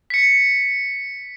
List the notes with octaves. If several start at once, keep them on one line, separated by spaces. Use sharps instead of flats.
B6 C#7